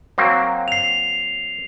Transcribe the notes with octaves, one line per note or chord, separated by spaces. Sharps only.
F#3 A#3 C4
C7 F7